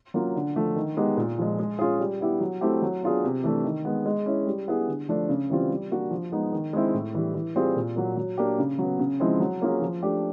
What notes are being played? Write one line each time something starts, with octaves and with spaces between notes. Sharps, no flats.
F#3 A#3 C#4 F4
D3
F3 A3
D#3
G#3 B3 D#4 G4
A#2
F3 G#3
G#3
C#4 F4 G#4
G3
B3 E4 G4
F#3
A3 C4 E4 G4
F#3
B3 D4 F4 G#4
C3
E3 A3 D4
D#3
G#3 B3
G#3
C#4 E4
G3
B3 E4 G#4
D3
F3 A3 D4
C#3
E3 G3 C4 F4
G3
A#3 D4 F#4
F3
G#3 B3 D#4
D#3
G#3 C4 E4
A2
E3 G3
E3
G3 C4 F4 G#4
A#2
F#3 A#3
F#3
A#3 D4 G4
C#3
F#3 B3
C#3
F3 G#3 C4 E4
F#3
A#3 C#4 F4 G#4
F3
A3 D4 G4